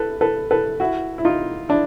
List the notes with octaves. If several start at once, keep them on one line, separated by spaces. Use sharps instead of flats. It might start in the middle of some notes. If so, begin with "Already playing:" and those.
Already playing: A4 B4
A4 B4
A4 B4
E4 F#4
E4
D#4 F4
D4 E4